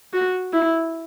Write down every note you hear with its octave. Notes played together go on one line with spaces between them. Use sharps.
F#4
E4